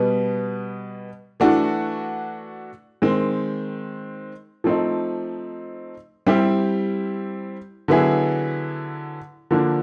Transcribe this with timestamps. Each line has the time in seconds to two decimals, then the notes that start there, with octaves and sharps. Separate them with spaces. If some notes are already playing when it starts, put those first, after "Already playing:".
Already playing: B2 G3 B3
1.40 E3 A3 D4 F#4
3.02 D#3 G#3 C4
4.64 F3 A3 C4 D#4
6.26 G3 C4 E4 G4
7.88 D3 F#3 B3 E4 G#4
9.51 D3 F3 A#3 D4